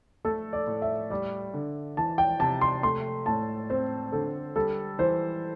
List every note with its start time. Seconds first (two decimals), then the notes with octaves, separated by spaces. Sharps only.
0.25 A3 A4
0.53 D5
0.67 A2
0.82 E5
1.10 G3 D5
1.54 D3
1.97 E3 A5
2.18 G5
2.39 C3 A5
2.61 C6
2.83 A3 C6
3.26 A2 A5
3.70 C4 C5
4.12 D3 A4
4.56 G3 A4
4.98 E3 C5